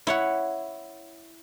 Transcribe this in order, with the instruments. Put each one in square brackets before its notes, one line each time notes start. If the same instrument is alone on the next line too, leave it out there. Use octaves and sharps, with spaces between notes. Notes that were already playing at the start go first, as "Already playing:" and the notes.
[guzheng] E4 C#5 F#5